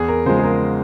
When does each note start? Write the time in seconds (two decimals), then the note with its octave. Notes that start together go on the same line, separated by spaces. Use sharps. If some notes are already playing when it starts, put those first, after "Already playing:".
Already playing: E2 G#4
0.08 A#4
0.26 C#3 F3 G#3 C5
0.39 G#4
0.44 A#4